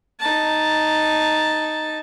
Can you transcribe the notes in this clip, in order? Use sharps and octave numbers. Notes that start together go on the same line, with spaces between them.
D#4 A5